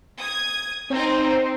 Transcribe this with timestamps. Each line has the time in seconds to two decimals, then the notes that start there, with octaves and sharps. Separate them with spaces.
0.21 D#6 G#6
0.90 C4 D#4 C5